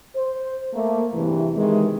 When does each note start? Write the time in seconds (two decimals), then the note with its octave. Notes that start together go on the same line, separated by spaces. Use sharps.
0.16 C5
0.74 A3 A#3
1.14 E2 G2 C3 E3
1.57 C3 D#3 E3 G#3